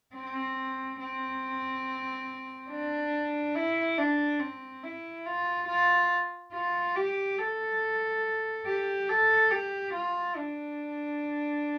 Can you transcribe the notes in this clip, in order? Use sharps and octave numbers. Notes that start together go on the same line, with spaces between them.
C4
C4
D4
E4
D4
C4
E4
F4
F4
F4
G4
A4
G4
A4
G4
F4
D4